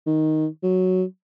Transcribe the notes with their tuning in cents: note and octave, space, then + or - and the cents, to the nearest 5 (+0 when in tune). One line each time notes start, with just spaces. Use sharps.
D#3 +5
F#3 +0